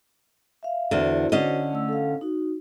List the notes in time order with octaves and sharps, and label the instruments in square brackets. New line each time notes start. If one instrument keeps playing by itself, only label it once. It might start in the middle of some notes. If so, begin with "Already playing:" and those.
[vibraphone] E5 F5
[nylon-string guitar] E2 D3 [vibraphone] F#4 C5
[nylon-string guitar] D3 C#4 D#5
[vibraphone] A3 E6
A4 F5
D#4 F#4